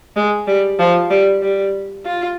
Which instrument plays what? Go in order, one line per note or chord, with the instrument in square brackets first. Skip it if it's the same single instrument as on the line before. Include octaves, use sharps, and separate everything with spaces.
[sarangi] G#3
G3
F3
G3
G3
F4